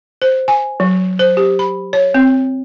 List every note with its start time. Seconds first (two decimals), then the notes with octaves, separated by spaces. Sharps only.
0.22 C5
0.48 G#5
0.80 F#3
1.19 C5
1.37 G4
1.59 B5
1.93 C#5
2.14 C4